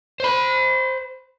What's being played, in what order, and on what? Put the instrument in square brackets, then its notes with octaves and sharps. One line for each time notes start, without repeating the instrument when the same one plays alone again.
[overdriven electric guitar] C5 B5